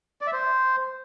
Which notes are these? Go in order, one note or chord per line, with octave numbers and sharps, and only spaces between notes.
D5
E5
C5